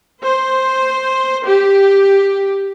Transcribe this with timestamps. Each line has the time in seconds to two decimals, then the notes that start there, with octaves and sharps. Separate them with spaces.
0.25 C5
1.45 G4